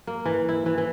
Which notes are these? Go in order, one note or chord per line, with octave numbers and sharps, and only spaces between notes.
A#3
E3
E4
E3
E3